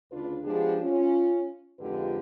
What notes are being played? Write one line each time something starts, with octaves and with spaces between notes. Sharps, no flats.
D2 C#3 D4 F4 B4
F3 G#3 B3 D4 G4 G#4
C#4 F4
F2 G#2 D3 F4 G4 B4